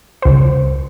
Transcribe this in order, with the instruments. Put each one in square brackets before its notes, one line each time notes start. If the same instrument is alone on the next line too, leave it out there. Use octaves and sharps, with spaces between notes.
[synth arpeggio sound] C#2 C5